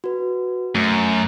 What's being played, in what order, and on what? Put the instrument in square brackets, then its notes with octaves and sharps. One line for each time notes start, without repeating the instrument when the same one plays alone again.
[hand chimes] F#4 B4
[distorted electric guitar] F#2 [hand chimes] A3